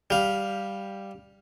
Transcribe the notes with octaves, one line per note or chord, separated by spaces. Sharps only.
G3 F5